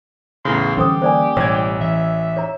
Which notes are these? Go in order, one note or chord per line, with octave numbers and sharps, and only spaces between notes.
E2 A2 C#3 C6
D3 E3 G3 C#4 G4 A4 C5 D#6
A#3 C5 D5 G#5
A1 B2 G3 C#5 E6 G#6
E3 E5
C#5 A#5